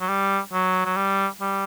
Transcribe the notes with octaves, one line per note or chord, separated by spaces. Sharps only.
F#3
G3
F#3
F#3
G3
G3